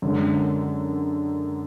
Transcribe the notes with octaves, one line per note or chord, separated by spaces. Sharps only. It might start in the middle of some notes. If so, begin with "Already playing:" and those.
F#2 D3 G#3